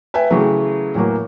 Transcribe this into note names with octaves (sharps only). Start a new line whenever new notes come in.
B4 E5 G5 G#5
C#3 E3 F#3 A3
A2 E3 F#3 A#3